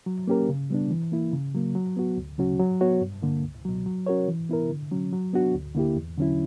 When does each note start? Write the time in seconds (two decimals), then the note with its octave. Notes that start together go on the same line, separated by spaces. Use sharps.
0.06 F#3
0.27 A#3 C#4 G4 A#4
0.49 C#3
0.70 G3 B3 D4
0.91 E3
1.12 A#3 E4
1.33 C#3
1.54 F#3 A#3
1.75 F#3
1.96 B3 F#4
2.18 D2
2.38 C#3 F#3 C#4 F#4
2.60 F#3
2.81 B3 F#4 C#5
3.01 G2
3.23 D3 A#3
3.44 C#2
3.65 B2 F#3
3.86 F#3
4.07 C#4 F#4 A#4 C#5
4.28 E3
4.49 B3 E4 A#4
4.70 D3
4.91 F#3 C#4
5.12 F#3
5.33 B3 D4 F#4
5.54 D2
5.75 D3 A#3 E4 G4
5.97 E2
6.17 D3 F#3 C#4 E4